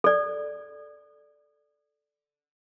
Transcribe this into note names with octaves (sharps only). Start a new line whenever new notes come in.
A4 D5